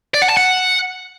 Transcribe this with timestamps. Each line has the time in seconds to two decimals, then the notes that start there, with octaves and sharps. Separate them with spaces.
0.14 D5
0.22 F#5
0.29 A5
0.37 F#5